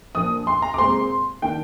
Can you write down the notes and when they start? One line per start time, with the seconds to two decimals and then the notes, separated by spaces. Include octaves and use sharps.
0.15 A#2 F3 A#3 D4 D#6
0.47 C6
0.62 A#5
0.74 D6
0.78 A#2 G#3 C4 C6
1.42 D#3 A#3 D4 G5